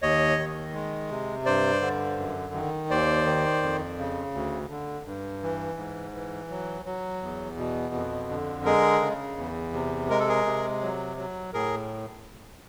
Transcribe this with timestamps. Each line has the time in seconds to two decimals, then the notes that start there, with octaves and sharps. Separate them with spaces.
0.02 D#2 C#5 D#5
0.38 D#3
0.74 G#3
1.10 C3
1.46 G2 C5 D5
1.81 D3
2.18 F#2
2.54 D#3
2.90 D#2 C5 D5
3.26 D#3
3.62 F2
3.98 C#3
4.33 D2
4.70 D3
5.06 G2
5.42 E3
5.77 G#2
6.14 E3
6.50 F#3
6.85 F#3
7.22 E2
7.57 B2
7.94 F2
8.29 D3
8.65 G#3 G#4 A#4
9.01 C#3
9.37 E2
9.73 C3
10.10 G#3 A#4
10.19 A4
10.28 G#4 A#4
10.45 C3
10.82 F#3
11.17 F#3
11.54 A2 G#4 A#4